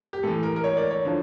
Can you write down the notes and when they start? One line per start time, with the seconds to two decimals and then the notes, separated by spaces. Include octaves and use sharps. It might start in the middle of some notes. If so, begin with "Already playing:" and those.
0.13 G4
0.23 A2 E3 A4
0.43 A#4
0.56 A#4
0.64 C#5
0.77 D5
0.91 C#5
1.05 D3 F3